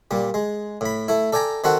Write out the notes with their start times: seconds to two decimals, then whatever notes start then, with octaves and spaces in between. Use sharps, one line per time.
0.11 A#2 G3
0.34 G#3
0.81 A2 B5
1.08 A3 E4
1.33 A4 D5 G5 G#5 A#5
1.64 D#3 C4 F#4 A4 F#5